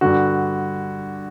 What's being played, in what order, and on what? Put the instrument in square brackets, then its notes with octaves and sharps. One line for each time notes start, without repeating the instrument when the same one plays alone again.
[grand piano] G2 D3 F#4